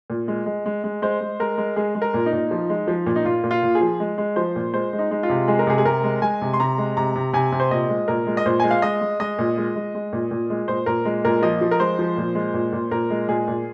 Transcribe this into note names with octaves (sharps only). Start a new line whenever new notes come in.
A#2
G#3
G#3
G#3
G#3
G#3 C5
G#3
G#3 A#4
G#3
G#3 G#4
G#3
A#4
A#2
D#4
A#2
F3
G#3
F3
A#2
D#4
A#2 F4
A#2
F4
A#2
G#4
F3
G#3
G#3
F3 C5
A#2
G#3 C5
G#3
D#4
G#3
F4
C3
G#3 G#4
A#4
C3 G#4
G#4
C3 A#4
G#3
G#3 G#5
C3
C6
C3 A#5
G#3
C3 A#5
C3
C3 G#5
C3
C5
A#2 D#5
G#3
A#2 A#4
G#3
D#5
A#2 C5
G#3 G#5
F5
G#3 D#5
G#3
G#3 D#5
A#2
G#3
G#3
G#3
A#2
A#2
G#3
A#2 C5
A#2 A#4
G#3
A#2 A#4
F3 D#5
F3
A#4
G#3 C5
F3
A#2
G#3
A#2
A#2
A#2 A#4
G#3
A#2 G#4
A#2